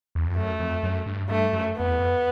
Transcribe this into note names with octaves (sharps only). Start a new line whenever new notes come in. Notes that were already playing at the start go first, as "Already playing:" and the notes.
E2
F2
F#2 A3
F2
F#2
G2
G2 A3
F#2
F2 B3
E2
F2